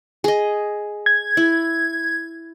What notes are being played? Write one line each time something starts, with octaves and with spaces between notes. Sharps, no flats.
G#4 D#5
G#6
E4